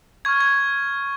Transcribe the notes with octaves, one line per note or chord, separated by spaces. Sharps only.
C#6 F6 G#6
G#6